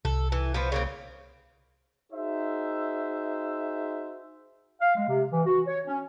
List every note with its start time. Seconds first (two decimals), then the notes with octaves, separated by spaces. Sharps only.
0.05 C2 A4
0.32 E3
0.54 F3 B3 C4
0.72 C#3 A#3 C4
2.12 D#4 F#4 G#4 C5 E5
4.81 F5
4.96 G#3
5.09 C3
5.32 E3
5.46 F#4
5.67 C#5
5.87 C#4